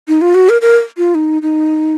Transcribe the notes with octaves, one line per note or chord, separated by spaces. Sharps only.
D#4
F4
F#4
A#4
A#4
F4
D#4
D#4